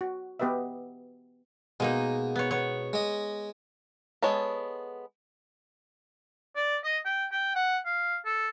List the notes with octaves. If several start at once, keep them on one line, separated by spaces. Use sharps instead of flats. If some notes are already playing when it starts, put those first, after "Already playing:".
F#4
B3 G4 B4 D#5 E5
B2 G#3 A#3 D#4
B3 C#5
B3 C#5
G#3 D#5
G#3 B3 A4 C#5
D5
D#5
G5
G5
F#5
F5
A4